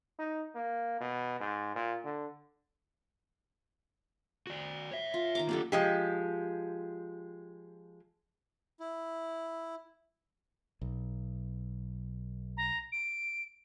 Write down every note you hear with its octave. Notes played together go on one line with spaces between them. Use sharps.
D#4
A#3
B2
G#2
A#2
D3
F#4 D5
C#5 E5
F4
D#3 A#5 D6
A#3 C#4 D4 G4 A4
F3 G#3 G4
E4
B1
A#5
D7